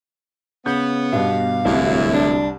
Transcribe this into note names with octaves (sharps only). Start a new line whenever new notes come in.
C#3 B3 G6
G2 B2 F5
D1 C2 F#2 E4
D4